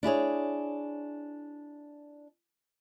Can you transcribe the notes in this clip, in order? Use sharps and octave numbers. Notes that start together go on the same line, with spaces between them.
D4 E4 G#4 C#5